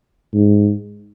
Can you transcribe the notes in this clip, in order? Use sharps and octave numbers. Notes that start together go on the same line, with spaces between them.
G#2